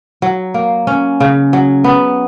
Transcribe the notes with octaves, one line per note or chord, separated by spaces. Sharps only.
F#3
A#3
C#4
C#3
F#3
B3